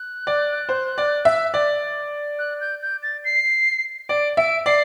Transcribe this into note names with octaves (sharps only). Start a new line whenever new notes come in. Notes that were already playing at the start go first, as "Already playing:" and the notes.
Already playing: F#6
D5
C5
D5
E5
D5
F#6
G6
G6
A6
C7
D5 D7
E5 D7
D5 C7